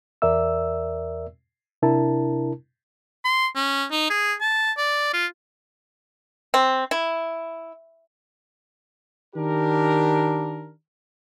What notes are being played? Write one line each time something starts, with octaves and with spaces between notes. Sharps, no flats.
E2 A#4 D5 E5 E6
C3 D4 E4 A#4 A5
C6
C#4
D#4
G#4
A5
D5
F4
C4
E4
D#3 D4 G4 A#4